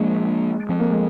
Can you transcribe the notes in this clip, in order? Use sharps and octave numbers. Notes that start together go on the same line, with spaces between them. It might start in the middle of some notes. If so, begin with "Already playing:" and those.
Already playing: F3 G#3 A#3 D4
F3 C4
A#3
G#3